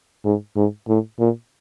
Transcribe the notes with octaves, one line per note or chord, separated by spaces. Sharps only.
G#2
G#2
A2
A#2